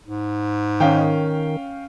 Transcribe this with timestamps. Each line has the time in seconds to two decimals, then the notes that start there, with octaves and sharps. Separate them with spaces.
0.07 G#2
0.80 D#3 C#4 F5 G5